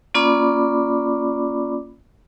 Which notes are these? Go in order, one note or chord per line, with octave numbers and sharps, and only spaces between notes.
A#3 C#4 F4 D5 B5 D6